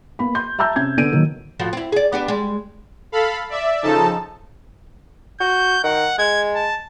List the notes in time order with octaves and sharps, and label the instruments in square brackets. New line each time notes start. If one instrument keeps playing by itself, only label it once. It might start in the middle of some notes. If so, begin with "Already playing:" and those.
[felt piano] A#3 B3 B5
C6 G6
E5 A5 A#5 E6 G6
C3 C#4 G#6
D3 B3 D5 D7 D#7
A#2 D#3 F#3
[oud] A2 F3 F#4
C4 E4
G#4 D5
B3 D4 G4
G3 G#3
[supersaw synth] A4 F5 B5
D5 E5
C#3 F3 D#4 A4 A5
[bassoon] F#4 [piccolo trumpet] G6
[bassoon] D#3 [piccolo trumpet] F#5
[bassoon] G#3 [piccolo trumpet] G#6
[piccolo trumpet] A5